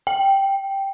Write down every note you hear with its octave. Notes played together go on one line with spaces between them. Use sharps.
G5